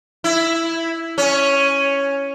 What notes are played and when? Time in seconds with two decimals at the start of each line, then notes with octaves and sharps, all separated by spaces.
0.24 E4
1.18 C#4